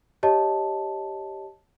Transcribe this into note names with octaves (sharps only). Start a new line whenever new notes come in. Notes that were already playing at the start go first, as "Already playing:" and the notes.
G4 C#5 D#5 A5